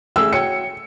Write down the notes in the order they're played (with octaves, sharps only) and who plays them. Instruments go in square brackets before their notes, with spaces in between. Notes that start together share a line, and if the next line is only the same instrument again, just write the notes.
[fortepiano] A1 A3 G#4 [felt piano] E6
[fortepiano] F#4 C#5 G5 [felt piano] C#7